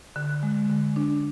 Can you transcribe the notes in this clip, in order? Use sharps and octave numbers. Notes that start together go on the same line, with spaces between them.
D3
G#3
D3
D4